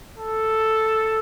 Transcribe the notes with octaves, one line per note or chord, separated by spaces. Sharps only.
A4